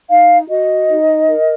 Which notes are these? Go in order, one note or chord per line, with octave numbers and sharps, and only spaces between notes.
D#4 F5
F#4 D#5
D#4
A#4